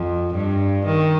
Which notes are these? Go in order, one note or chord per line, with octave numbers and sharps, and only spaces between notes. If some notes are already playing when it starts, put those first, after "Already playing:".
Already playing: F2
G2
D#3